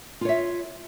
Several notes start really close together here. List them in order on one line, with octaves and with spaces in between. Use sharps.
F4 C#5 E5